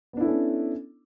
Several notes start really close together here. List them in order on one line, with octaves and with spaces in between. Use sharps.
B3 D4 E4 A4 C#4